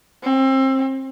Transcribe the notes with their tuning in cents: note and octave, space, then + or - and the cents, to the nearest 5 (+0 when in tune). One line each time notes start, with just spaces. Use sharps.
C4 +30